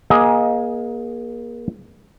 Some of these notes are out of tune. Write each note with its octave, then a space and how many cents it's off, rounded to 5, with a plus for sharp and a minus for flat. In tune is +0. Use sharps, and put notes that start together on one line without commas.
A#3 +30 G#4 +0 D#5 +20